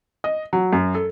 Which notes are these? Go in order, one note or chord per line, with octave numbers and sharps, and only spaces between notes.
D#5
F#3
F#2
A4